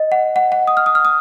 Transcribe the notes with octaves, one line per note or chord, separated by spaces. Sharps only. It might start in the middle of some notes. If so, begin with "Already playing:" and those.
Already playing: D#5
F#5
F#5
F#5
D#6
F6
D#6
F6
D#6